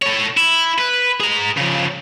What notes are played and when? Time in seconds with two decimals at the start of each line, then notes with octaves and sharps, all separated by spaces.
0.02 A4 C#5
0.37 E4
0.79 B4
1.20 G#4 A#5
1.58 C#3 F3